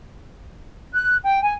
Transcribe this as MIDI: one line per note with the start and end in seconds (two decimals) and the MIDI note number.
0.93 1.15 90
1.24 1.39 79
1.41 1.53 80